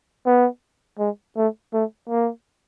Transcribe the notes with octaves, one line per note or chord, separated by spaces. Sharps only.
B3
G#3
A3
A3
A#3